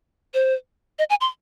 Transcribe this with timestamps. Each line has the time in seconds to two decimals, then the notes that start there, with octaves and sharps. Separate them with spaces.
0.34 C5
0.99 D#5
1.10 G#5
1.21 C6